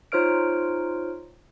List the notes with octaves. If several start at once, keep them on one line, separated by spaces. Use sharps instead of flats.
D#4 F4 C5 C#5 F6 D7